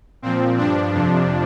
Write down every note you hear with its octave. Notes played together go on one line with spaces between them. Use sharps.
A#2 F3 C4
G2 F3 D4
F2 C3 F3